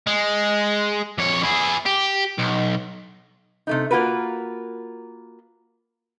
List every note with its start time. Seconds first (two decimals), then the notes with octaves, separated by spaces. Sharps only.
0.07 G#3
1.18 F2 C#5
1.43 E4 G#4
1.86 G4
2.38 B1
3.67 C3 A3 D#4
3.91 A#3 F4 F#4 A#4 B4